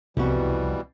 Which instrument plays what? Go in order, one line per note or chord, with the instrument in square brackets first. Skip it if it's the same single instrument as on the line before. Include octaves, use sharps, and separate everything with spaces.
[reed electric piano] C2 [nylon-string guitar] F2 B3 F#4 [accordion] B2 E3 G3